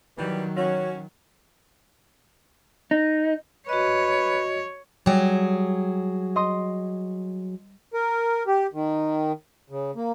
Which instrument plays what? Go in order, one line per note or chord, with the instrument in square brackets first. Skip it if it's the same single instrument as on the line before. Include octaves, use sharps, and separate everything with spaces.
[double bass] D#3 F#3 [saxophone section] E3 G3
[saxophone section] C#4 F#4 [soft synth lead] C#5
[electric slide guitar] D#4
[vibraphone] F#4 D#5 [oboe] B4 [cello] C#5
[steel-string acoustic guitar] F#3 G#4 [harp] G3
[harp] D#5 C6 D#6
[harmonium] A#4
G4
D#3
C#3
A#3